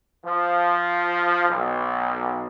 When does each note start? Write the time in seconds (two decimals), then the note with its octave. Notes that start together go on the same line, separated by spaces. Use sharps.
0.24 F3
1.49 B1